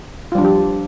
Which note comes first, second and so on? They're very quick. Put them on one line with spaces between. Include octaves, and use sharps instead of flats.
F4 G3 D4 F3 G4